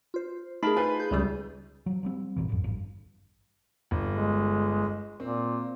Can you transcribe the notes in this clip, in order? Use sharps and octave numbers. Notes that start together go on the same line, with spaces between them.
F4 C5
A3 D#4 G#4 A#4 A5 B5
F4 B4 C5 G#5
G#4 G6
C#2 C#3 G3
F3 F#3
F3 G3 C4
G#1 A#2 E3
G#1 F2
G#1 G2
G1
G#3
A#2 C4